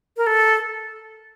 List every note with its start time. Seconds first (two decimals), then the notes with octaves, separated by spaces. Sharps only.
0.17 A#4
0.27 A4